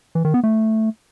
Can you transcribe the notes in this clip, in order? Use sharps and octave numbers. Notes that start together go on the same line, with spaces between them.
E3
D#3
B3
A3